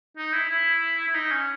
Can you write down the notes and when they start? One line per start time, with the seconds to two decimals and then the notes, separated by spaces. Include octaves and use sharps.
0.17 D#4
0.33 E4
0.49 E4
1.08 E4
1.15 D#4
1.31 C#4